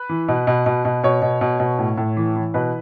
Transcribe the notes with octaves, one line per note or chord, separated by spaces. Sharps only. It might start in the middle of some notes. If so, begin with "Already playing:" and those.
Already playing: B4
E3
B2
B2
B2
B2
B2 C#5
B2
B2
B2
A2
A2
E3
E3
B2 B4